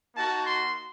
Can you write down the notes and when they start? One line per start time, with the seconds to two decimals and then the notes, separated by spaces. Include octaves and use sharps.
0.15 A#3 D#4 F#4 A5
0.45 C6